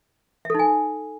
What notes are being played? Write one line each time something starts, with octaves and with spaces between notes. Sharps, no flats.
D#4 A4 E5 G#5